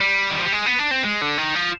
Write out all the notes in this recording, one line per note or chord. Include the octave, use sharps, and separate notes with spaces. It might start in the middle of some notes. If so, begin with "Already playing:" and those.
G3
D#3
F3
G3
G#3
B3
D4
C4
G#3
D3
D#3
F3